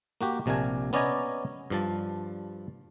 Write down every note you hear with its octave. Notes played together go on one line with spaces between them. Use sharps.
A#3 F#4 G4
A#1 C3 D4 A#4 G#5
B3 C#4 D5 D#5 G#5 A#5
G2 F3 A5